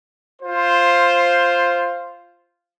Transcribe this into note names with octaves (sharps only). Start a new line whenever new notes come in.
F4 C5